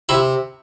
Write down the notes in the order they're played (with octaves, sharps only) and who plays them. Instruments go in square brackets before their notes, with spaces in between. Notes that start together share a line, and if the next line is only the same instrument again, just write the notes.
[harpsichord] C3 E4